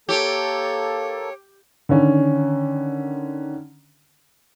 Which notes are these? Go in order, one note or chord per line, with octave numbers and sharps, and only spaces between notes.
A#3 G4 A4 C#5
D3 D#3 C#4